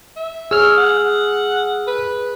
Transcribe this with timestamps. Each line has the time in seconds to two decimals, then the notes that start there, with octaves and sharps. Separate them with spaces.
0.16 E5
0.51 G#4 C#5 E6 F6
0.78 F#5
1.87 B4